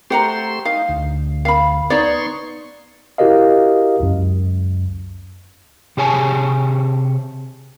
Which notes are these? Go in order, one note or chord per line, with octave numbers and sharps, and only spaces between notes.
A3 G4 C5 F#5 A#5 C6
D#4 F5
D2
F5 B5
B3 D#4 C#5 D5 C6 C#6
E4 F#4 G4 A#4 D#5 F5
C#2 F#2
C3 G4 G#4 C#5 G#5 A5